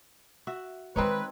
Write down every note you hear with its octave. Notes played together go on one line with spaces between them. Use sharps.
F#4 E5
D#3 G#3 C4 D#4 B4 C#5